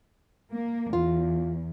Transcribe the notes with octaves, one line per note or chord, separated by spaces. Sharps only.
A#3
E2 F4